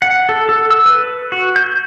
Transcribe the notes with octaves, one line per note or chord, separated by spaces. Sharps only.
F#5
A4
A4
E6
B4
F#4
G6